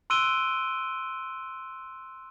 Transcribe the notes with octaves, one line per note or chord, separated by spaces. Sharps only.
C6 E6 F#6 D7 D#7 G7